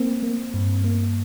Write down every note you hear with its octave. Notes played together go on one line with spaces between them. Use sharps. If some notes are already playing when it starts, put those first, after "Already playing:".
Already playing: A#3 C4
A#3
G2
A#3